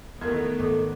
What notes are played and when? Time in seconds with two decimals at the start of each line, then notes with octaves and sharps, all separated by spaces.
0.21 E2 D#3 A3 B3 E4 G4 A#4 G#6
0.59 G#1 A4 D6